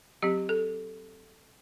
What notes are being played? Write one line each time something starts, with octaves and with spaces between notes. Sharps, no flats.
F#3 C4 G4
A4